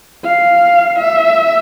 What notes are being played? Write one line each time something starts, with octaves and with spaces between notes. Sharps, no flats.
F5
E5